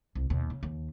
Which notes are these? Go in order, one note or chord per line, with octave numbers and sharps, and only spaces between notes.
C2
D#2 B2
C#3
D#2